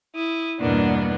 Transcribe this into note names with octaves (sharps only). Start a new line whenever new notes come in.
E4 D#6
E2 G2 B2 A#3 B3 D4